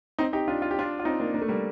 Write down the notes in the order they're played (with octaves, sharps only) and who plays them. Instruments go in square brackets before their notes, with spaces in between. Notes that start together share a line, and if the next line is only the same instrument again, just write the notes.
[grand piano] C4 D#4
D#4 G4
D4 F4
F4
G4
D4 F4
F4
C4 D#4
A#3 D4
A#3 D4
A3
G3 A#3